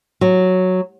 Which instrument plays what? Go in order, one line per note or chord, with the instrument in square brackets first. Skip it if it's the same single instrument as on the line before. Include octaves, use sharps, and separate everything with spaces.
[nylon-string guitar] F#3